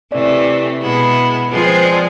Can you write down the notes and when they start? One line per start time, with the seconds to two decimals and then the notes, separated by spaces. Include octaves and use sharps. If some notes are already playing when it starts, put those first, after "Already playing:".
0.12 C3 E3 A3 D5
0.81 B2 G#3 B3 E4
1.49 F3 G#3 C4 G#4 B4
1.66 C5
1.84 D5